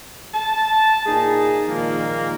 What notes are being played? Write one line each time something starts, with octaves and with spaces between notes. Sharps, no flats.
A5
A#2 D#4 G#4
A#2 D#3 F3 G#3 A#3